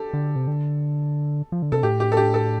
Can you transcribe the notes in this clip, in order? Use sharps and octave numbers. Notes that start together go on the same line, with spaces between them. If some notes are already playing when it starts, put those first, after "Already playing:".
Already playing: G4 A4
D3
C3
D3
F3
D3
C3 A4
A2 G4
G4
A4
G4
A4